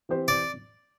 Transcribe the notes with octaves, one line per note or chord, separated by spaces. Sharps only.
E3 C4 G4 C5
D5